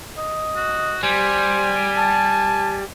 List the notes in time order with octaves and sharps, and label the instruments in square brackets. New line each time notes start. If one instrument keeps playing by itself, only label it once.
[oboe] D#5
[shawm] F#4
[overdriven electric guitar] G3 [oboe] C5 [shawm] G#5
[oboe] A5